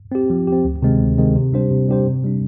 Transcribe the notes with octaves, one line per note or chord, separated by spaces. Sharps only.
C4 G4
F3
C4 G4
D2
C3 D#3 G#3 C4
D2
C3 D#3 G#3 C4
C3
G3 D4 G4 C5
C3
G3 D4 G4 C5
C3
G3 D4